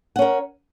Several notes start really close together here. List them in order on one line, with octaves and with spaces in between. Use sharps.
F#5 C#4 A#4